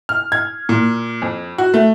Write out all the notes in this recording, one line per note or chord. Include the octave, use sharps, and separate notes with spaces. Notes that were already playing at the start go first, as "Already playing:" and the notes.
F6
G#6
A#2
F2
F#4
A3